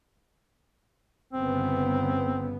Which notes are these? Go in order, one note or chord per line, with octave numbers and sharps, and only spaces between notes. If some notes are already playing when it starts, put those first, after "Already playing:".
G1 C#3 B3 C4